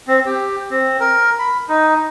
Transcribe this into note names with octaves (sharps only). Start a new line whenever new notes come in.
C4
G4
C4
A#4
B5
D#4